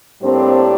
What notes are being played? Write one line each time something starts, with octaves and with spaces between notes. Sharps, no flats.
A2 G3 A#3 C4 D4 C5